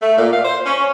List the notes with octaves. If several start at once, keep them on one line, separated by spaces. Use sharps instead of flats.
A3
A#2
F5
C5
C#4